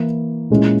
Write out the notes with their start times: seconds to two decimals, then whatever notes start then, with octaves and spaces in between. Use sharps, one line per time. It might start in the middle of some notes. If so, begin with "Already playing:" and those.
Already playing: E3 A#3 E4
0.50 A#2 G#3 C#4 E4